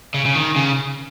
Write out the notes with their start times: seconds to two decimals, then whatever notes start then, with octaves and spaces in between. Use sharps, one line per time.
0.14 C#3
0.25 C#3
0.35 D#3
0.56 C#3